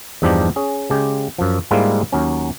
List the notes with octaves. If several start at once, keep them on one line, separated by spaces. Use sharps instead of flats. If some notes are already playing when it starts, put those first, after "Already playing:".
E2 G2 F3 D4 D#4 G4
C#4 G#4
C#3 G#3 G4
F#2 F3
G#2 G3 G#3 A#3 E4 F4
D#2 F#3 C#4